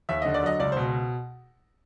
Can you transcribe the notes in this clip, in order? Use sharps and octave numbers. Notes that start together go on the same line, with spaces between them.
D#2 E5
D3 D#5
D5
F#3 D#5
C#2 D5
C5
B2